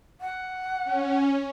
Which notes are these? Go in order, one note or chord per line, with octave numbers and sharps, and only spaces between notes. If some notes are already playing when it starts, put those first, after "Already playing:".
F#5
C#4